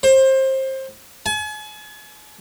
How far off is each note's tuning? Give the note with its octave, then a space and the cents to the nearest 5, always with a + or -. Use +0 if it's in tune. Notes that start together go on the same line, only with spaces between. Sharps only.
C5 +25
G#5 +40